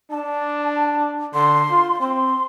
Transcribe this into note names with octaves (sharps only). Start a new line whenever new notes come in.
D4 A5
D3 C6
F4
C4 C6